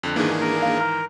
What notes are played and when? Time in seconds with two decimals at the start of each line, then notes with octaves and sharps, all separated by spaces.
0.03 F2 D3 F#6
0.16 G#2 D#3 E3 A#3 D4 G#4
0.41 A#4
0.62 F5
0.81 A#5 F6